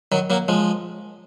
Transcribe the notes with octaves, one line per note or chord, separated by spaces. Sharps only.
D#3 F#3
F#3 A#3
F3 G#3